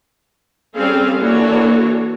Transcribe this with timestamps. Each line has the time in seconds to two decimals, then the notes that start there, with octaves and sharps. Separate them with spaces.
0.74 G3 C4 C#4 G#4 A4 F5
1.18 E3 A#3 D4 F#4 A4 C#5